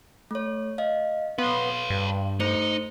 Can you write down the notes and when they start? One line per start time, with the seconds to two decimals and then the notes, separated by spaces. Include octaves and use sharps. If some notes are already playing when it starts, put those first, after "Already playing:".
0.31 A3 C#5
0.78 D#5 F5
1.38 B3 B4 C#5 F5 C6
1.90 G2
2.40 A3 D#4 C5 C#7